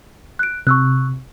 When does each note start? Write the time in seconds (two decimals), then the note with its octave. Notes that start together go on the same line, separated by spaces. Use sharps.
0.39 F#6 D7
0.67 C3 C#6 E6 F#6